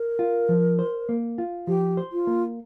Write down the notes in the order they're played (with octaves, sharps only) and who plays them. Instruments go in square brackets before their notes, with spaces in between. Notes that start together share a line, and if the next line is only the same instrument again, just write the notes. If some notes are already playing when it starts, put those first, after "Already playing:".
Already playing: [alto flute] A#4
[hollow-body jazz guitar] F4
F3
C5
A#3
F4
[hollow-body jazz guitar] F3 [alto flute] G4
[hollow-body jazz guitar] C5
[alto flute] F4
[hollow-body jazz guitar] A#3